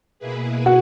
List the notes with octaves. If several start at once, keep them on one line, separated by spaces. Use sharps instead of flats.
B2 A#3 E4 G#4 B4
F#4